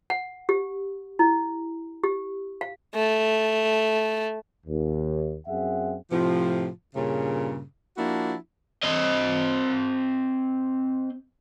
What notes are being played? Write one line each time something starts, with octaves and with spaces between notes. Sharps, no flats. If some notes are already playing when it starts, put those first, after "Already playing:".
F#5
G4
E4
G4
F5
A3
D#2
F#2 C4 G#4 E5 F#5
A2 C3 F3
G2 A#2 C#3
F3 A#3 D4 E4 F#4
C4 D#5